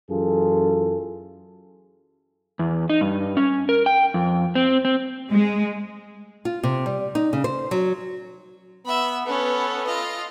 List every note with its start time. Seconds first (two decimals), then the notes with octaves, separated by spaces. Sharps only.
0.11 F#2 E3 F4 G#4 A4
2.59 E2
2.90 D#4
3.01 G2
3.37 C#4
3.69 A#4
3.86 G5
4.14 F2
4.55 C4
4.85 C4
5.31 G#3
6.45 F4
6.63 C3
6.86 G3
7.15 D#4
7.33 C#3
7.44 C5
7.71 F#3
8.86 B3 E5 B5
9.26 B3 C#4 A4 B4
9.87 F4 D#5